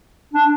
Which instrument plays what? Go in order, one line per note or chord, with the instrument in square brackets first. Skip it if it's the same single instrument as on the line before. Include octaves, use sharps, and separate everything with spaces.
[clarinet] D4